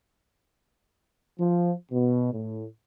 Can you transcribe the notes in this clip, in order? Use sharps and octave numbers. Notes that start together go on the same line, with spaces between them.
F3
B2
A2